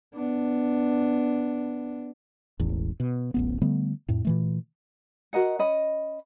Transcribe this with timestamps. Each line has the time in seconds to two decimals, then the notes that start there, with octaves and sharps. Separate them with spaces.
0.15 B3 D4
2.60 E1 A1 E2
3.00 B2
3.34 D1 A1 B3
3.62 D3 G3 A3 B3
4.09 F2 A2
4.25 A#2 E3 A3
5.33 F#4 A#4 D#5 F#5
5.59 C#4 D#5 B5